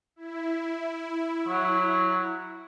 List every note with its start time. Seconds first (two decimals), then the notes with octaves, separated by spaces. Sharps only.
0.16 E4
1.48 F#3